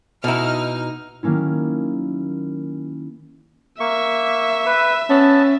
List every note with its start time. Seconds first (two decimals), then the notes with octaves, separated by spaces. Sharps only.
0.24 B2 D#4 E4 F6
1.23 D#3 F#3 A#3 C#4 E4
3.80 A#3 E5 C#6
4.66 B4
5.10 B3 C#4 A5